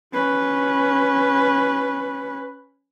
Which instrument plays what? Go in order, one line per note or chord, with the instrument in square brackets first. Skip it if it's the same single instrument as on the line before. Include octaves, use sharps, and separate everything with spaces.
[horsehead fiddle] C#4 B4